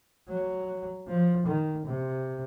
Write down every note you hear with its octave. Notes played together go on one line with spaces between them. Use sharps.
F#3
F3
D#3
C3